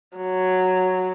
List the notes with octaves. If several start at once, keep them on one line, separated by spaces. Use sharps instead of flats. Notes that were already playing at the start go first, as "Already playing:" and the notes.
F#3